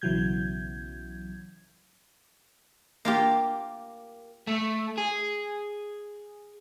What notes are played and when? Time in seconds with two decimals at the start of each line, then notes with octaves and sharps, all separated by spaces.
0.02 B1 C#3 E3 F#3 G6 G#6
3.05 A#3 F4 G4
4.47 A3
4.98 G#4